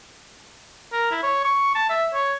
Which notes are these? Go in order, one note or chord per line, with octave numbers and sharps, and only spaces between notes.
A#4
E4
C#5
C#6
A5
E5
C#5